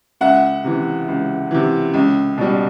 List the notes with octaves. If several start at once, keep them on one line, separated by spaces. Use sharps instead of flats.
C#2 E5 F#5
C3 E3
C#2
C3 E3
C#2
B2 G3